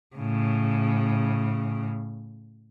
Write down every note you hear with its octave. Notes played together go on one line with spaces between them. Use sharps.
A2 C#3